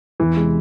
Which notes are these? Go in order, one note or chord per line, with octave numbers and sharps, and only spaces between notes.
E2 E3
C3 G#3